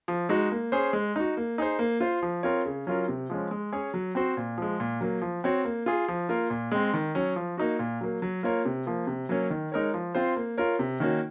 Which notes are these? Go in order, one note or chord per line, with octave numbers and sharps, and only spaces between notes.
F3
G#3 D#4 F#4
A#3
C#4 G#4 C5
G#3
D#4 F#4
A#3
D#4 G#4 C5
A#3
F4 C5
F3
C4 F4 A#4 C#5
C#3
F#3 C#4 F4 A#4
C3
F3 G#3 C#4
G#3
C#4 G#4 C#5
F#3
C4 F#4 C5
A#2
F3 G#3
A#2
F#3 A#3
F3
C4 F#4 C#5
A#3
F4 G#4
F3
A#3 F4 A#4
A#2
G#3 C4
D#3
F#3 C#4
F3
A#3 D#4 F#4
A#2
F#3 A#3
F#3
A#3 F4 A#4 C#5
C3
F3 A#3
C3
F#3 A#3 C#4
D#3
G#3 D#4 A#4 C#5
F3
C4 F4 C5
A#3
F4 A#4 C#5
C3
D#3 A#3 C#4 F#4